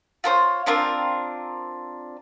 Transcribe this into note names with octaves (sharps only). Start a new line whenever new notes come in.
F4 A4 C5 C#5
C4 D4 F4 A#4